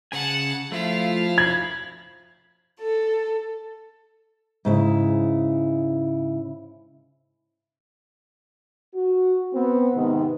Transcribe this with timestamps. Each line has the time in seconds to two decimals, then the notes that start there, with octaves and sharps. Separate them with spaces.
0.12 C#3 F#5 G#5 A5
0.72 F3 A3 E4 F4 F5
1.38 B5 G#6
2.80 A4
4.65 G#2 C#3 E4
8.95 F#4
9.53 B3 C4
9.94 G#2 C3 D#3 B3